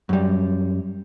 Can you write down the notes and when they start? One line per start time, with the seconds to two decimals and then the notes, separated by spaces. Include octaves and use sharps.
0.09 F#2 G3